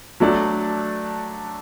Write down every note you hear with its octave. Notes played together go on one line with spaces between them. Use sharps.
F#3 A3 D4 A4 D5